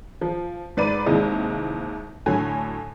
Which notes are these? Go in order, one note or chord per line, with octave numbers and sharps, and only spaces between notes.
F3
G#2 B4 D5 D#7
D#2 C3 E3 G#3
A2 D3 F#3 G#5